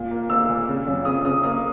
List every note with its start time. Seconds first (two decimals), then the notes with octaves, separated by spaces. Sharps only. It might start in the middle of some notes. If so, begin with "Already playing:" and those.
Already playing: A#2
0.11 A#3
0.30 A#3 E6
0.49 A#2
0.67 C#3
0.87 F#2
1.05 C#3 D#6
1.24 C#3 D#6
1.43 A#3 D#6